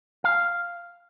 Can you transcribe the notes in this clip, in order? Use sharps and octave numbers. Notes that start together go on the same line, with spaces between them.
F5